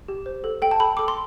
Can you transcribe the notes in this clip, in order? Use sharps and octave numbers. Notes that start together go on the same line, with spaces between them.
G4
C5
A4
A4 G5
A5
A4 B5
A4 D6
C6